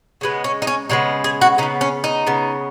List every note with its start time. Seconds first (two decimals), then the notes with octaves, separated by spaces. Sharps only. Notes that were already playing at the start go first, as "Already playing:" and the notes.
0.21 C#3 G#3 B3
0.44 C#4
0.62 D#4
0.67 C#4
0.89 C#3 G#3 B3 D#4
1.24 G#4
1.41 F#4
1.58 C#3 D#4
1.63 B3
1.81 C#4
2.04 D#4
2.27 C#3 B3